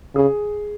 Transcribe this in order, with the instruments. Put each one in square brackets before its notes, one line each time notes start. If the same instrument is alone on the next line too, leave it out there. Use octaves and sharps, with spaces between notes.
[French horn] C#3 [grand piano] G#4